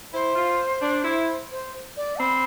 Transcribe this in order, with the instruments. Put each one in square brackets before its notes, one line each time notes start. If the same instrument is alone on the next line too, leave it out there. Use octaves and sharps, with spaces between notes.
[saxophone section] E4 [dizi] C5
[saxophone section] F4
D4
E4
[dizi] C5
D5
[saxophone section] C4 [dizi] B5